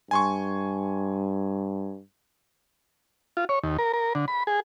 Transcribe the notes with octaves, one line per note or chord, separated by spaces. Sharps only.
G2 G#5 C6 C#6
F4
C#5
D#2
A#4
A#4
D3
B5
G#4